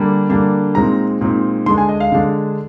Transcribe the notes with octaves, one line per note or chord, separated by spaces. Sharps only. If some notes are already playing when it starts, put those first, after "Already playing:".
Already playing: D3 G3 A#3 D4
D3 G3 A#3 D4
A#2 G#3 C4 D#4 A#5
A#2 G#3 C4 D#4
D3 G#3 D4 C6
G#5
D#5
F5
D3 G#3 D4